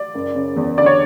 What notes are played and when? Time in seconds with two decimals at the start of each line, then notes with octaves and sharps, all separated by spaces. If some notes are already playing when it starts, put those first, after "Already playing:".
Already playing: D5
0.14 F#1
0.35 C#3
0.56 E2
0.78 D2 D5
0.86 C#5